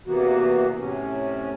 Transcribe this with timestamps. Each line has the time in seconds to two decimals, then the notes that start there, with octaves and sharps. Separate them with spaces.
0.07 E2 C3 E3 A#3 B3 F#4
0.78 A2 C3 C#4